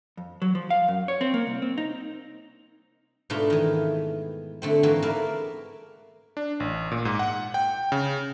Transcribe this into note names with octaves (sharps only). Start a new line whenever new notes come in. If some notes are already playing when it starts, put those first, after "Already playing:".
F2
F#3
F3
F5
F#2
C#5
C4
A#3
C2
C4
D#4
G#2 B2 A3 D4 F4
D#3 E3
D3 A3 C4
G#2 E3 A#3 C4 F#4
A#3 A#4 B4 D5 E5 A5
D4
A1
A#2
G#2
F#5
G5
C#3